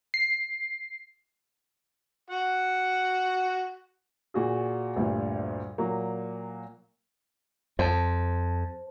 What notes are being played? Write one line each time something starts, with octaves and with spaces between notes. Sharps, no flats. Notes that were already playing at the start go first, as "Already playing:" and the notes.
C7
F#4 F#5
A#2 F#4 G#4
D2 G2 A#2
A#2 F#3 A#3
F2 C5 A5